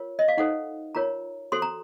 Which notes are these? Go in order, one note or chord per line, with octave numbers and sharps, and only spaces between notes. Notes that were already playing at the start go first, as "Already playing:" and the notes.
Already playing: F4 A#4 C#5
D#5
F5
D#4 A4 C5 F#5
F4 A#4 C#5 A#5
F#4 A4 C5 C6
A#5